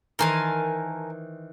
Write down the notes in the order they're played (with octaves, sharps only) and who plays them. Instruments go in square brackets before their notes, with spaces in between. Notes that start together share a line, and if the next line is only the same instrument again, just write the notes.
[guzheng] D#3 E3 C5 [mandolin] A#4 G#5 A5